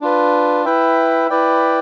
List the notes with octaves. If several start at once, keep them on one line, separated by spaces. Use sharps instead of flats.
D4 F4 B4
E4 B4 E5 G5
E4 B4 D5 G5